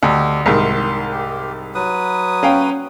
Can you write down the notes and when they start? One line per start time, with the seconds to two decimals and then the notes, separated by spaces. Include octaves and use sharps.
0.03 D2 G4 A4 D#5
0.46 C2 G#2 D#3 C6
1.12 G4
1.75 F#3 B4 D#6
2.43 C#4 F5 G5